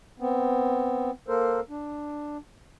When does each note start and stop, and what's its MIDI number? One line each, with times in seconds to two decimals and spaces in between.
0.20 1.11 59
0.20 1.11 60
1.28 1.60 58
1.28 1.60 69
1.28 1.60 70
1.28 1.60 72
1.70 2.38 62